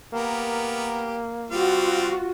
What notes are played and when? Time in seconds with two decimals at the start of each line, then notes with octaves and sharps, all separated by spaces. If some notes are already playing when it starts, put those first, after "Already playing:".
0.13 A#3 B3 G4 A#4
1.51 G3 C4 F4 F#4 F5